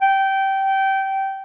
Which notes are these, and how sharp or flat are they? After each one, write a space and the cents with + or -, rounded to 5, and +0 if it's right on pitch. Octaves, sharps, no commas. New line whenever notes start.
G5 -20